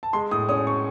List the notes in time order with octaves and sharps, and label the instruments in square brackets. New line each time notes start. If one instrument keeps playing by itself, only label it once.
[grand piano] A5
[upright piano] G#3 [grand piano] C6
[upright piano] A2 [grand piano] D#6
[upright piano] C#4 [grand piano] D#6
[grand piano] C#6